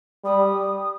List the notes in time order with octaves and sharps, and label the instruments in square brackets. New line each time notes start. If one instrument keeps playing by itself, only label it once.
[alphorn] G3 [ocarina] D#6